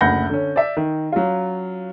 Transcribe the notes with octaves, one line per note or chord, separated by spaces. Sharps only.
F#1 D2 F#5 B5 G6 A#6
D3 C#4
D5 E5
D#3
F#3 C#4 F4